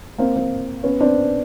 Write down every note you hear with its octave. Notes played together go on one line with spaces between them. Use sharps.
A#3 C4
A#3 C4
B3 C#4
C4 D4